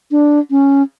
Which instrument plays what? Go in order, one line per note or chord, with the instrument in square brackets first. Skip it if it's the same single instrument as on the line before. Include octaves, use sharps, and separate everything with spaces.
[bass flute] D4
C#4